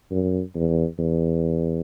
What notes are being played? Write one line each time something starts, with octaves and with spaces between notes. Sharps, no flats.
F#2
E2
E2